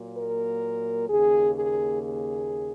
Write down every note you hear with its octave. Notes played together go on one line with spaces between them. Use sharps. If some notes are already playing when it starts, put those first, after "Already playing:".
Already playing: A#2 F#3 A#3
A#4
D#2 C#3 A#3 G#4
G#4
G#4